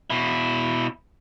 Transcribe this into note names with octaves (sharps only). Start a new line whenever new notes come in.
B2 E4